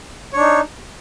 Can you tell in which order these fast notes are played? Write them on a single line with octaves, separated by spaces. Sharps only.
C#5 D4 D#4